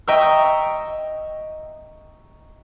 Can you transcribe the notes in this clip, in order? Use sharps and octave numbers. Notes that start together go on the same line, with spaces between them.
D#5 E5 G5 A#5 C#6 E6